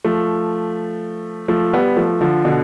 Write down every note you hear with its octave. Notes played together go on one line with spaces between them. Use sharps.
F3 A3
F3 A3
G3 B3
F3 A3
D3 F3
B2 D3